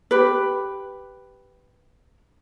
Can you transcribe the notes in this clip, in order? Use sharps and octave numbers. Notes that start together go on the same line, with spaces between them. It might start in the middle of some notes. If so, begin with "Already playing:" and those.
G4 B4